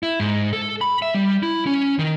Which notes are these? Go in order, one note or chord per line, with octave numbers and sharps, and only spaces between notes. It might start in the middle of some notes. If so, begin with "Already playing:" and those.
E4
G#2
A4
B5
E5
G3
E4
C#4
D#3